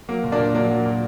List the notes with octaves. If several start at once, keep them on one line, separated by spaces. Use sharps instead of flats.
F#3 A#3
A#2
A#3 D4
A#2
F#3 A#3 D4
F#3
A#2